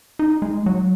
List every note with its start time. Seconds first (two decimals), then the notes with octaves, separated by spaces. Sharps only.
0.19 D#4
0.42 G#3
0.66 F#3